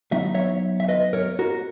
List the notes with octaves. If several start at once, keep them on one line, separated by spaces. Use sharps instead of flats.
F#3 B3 D#4 E5
C#5 E5
E5
B4 D#5
A#4 C#5
F#4 A#4